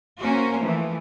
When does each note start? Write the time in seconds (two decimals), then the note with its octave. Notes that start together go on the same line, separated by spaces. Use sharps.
0.21 A#3 C#4 F#4 A#4 C5
0.61 E3 F3 A3